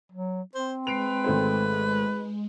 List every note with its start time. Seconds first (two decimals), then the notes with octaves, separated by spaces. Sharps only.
0.12 F#3
0.55 C4 C5
0.87 G#3 B4 C7 D7 F7
1.24 G#1 A3 C5